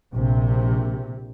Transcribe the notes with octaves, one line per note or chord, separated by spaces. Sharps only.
A#1 C3